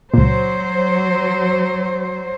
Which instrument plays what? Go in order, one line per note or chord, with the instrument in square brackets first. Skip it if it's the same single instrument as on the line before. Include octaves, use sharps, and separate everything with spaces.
[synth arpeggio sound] C#2 A#2 [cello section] F#3 C5